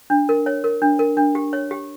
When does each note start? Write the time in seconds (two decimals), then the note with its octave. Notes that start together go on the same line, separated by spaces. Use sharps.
0.10 D4
0.29 A#4
0.46 C#5
0.64 A#4
0.82 D4
0.99 A#4
1.17 D4
1.35 G4
1.53 C#5
1.71 G4